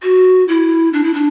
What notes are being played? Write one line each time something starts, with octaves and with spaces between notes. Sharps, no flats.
F#4
E4
D4
E4
D4